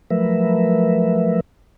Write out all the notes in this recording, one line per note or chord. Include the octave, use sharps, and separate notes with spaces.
F3 F#3 A3 A#4 B4 E5